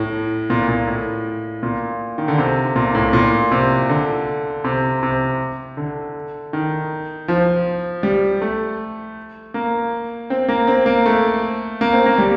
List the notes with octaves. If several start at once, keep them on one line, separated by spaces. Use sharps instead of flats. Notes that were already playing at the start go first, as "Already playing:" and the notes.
Already playing: A2
A#2
A#2
A2
A#2
D#3
D3
C3
A#2
A2
A#2
C3
D3
C3
C3
D3
D#3
F3
G3
A3
A#3
C4
A#3
C4
A#3
A3
A#3
C4
A#3
G3